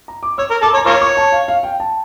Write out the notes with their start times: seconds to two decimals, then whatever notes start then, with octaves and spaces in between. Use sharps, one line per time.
0.08 A#5
0.23 D6
0.38 C#5 E6
0.51 A#4
0.62 A4 D6
0.74 C#5
0.77 A#5
0.86 F4 A#4 C#5 C#6
1.02 C#6
1.17 A5
1.32 F5
1.48 F5
1.63 G5
1.80 A5